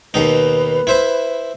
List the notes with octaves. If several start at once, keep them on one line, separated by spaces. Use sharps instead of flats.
D#2 B2 D#4 B4
E4 C5 E5